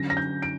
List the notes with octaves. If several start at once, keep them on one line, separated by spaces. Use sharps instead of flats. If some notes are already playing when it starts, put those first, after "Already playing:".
Already playing: D3 F#3 C#4 A#6
A#6
G6
D7